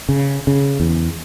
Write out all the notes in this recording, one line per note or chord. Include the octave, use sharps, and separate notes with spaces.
C#3
C#3
E2